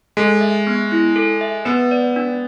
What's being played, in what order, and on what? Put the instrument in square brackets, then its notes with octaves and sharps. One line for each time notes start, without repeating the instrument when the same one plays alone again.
[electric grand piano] G#3 [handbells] A4
[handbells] E5
B3
E4
A4
E5
[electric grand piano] B3 [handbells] B4
[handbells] D5
D4